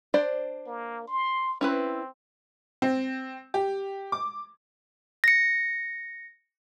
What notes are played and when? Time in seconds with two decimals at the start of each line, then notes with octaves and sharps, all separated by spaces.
0.14 D4 C5 D5
0.66 A#3
1.07 C6
1.61 C4 C#4 E4 B4
2.82 C4
3.54 G4
4.12 D6
5.24 A#6 C#7